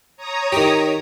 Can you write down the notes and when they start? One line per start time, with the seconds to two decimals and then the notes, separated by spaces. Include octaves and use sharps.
0.17 C#5 A#5 D#6
0.52 D#3 G4